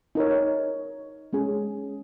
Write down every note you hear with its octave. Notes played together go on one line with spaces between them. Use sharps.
D#4 A#4 C#5
G#3 C#4 G#4